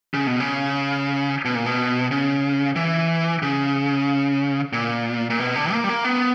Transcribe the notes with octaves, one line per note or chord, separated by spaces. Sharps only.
C#3
B2
C#3
B2
A#2
B2
C#3
E3
C#3
A#2
A#2
B2
D3
A#3
G3
A#3
B3